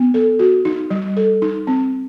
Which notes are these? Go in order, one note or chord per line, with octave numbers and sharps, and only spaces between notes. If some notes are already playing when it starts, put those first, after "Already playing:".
Already playing: B3
A4
F#4
D#4
G3
A4
D#4
C4